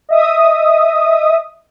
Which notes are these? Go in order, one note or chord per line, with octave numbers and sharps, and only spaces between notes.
D#5 E5 D#6